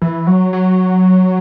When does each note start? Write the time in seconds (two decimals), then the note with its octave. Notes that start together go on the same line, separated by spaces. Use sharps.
0.02 E3
0.27 F#3
0.53 F#3